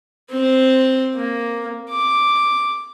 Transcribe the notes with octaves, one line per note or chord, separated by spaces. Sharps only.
C4 C5
A#3
D6